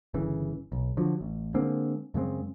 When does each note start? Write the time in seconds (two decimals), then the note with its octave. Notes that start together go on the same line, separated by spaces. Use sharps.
0.14 G1 C#3 E3
0.72 B1
0.97 D3 F3 F#3
1.21 A1
1.54 D3 G#3 A#3 C4
2.14 F#2 C#3 G#3 C4